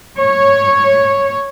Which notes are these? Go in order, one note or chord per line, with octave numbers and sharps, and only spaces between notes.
C#5